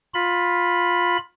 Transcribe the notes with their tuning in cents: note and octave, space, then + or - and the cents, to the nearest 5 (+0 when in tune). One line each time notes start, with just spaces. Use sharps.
F4 +15 B5 +0